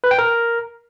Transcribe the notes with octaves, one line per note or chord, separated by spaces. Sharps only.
B4
G5
A#4